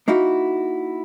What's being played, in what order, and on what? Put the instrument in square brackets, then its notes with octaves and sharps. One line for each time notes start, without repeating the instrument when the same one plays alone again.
[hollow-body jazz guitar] A#3 D#4 E4 F#4